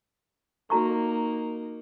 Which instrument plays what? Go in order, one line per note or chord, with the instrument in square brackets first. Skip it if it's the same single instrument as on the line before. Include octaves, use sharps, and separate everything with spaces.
[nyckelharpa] A#3 D#4 [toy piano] F#4 A#5 C#6